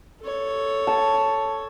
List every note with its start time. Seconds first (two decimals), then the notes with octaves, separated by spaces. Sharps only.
0.21 A4 C#5
0.87 A5